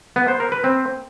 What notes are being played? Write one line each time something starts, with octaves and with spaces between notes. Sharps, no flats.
B3
C5
A#4
B4
C4